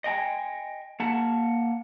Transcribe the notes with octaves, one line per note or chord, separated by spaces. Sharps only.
D#5 G5 G#5
A#3 F#5 A5